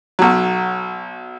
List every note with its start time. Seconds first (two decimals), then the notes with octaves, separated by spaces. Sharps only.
0.19 B1 F#3